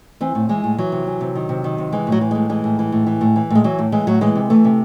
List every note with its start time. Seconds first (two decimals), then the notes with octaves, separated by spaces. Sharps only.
0.21 E3 C4
0.35 A2
0.49 E3 G#3
0.64 A2
0.78 E3 F#3
0.92 C3
1.07 E3
1.21 C3
1.35 D#3
1.49 C3
1.64 D#3
1.78 C3
1.92 E3 G#3
2.07 A2
2.12 F#3
2.21 E3
2.31 A2 G#3
2.49 E3 G#3
2.64 A2
2.79 E3
2.92 A2
3.07 E3
3.21 A2
3.36 E3
3.50 A2 G#3
3.64 E3 F#3
3.78 A2
3.92 E3 G#3
4.07 A2 F#3
4.21 E3 G#3
4.35 C3
4.50 E3 A3
4.65 C3